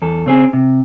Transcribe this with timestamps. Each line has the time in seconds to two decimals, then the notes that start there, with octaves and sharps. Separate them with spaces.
0.02 E2 A4
0.26 C#3 C4 G#4
0.53 C3